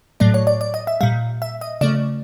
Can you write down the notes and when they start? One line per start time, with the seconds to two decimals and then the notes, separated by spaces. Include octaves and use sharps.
0.20 A2 F#3 A3 D5
0.34 C#5
0.47 D5
0.61 D5
0.74 D#5
0.87 E5
1.01 A#2 G3 F5
1.42 E5
1.61 D#5
1.81 C#3 F3 A3 D5